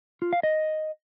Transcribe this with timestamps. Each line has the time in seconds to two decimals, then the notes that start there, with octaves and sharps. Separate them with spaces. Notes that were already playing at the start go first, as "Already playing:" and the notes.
0.22 F4
0.33 F5
0.43 D#5